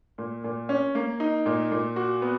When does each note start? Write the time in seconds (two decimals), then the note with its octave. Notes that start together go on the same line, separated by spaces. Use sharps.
0.18 A#2
0.44 A#2
0.69 C#4
0.95 A#3
1.20 D#4
1.46 A#2
1.71 A#2
1.96 F#4
2.22 B3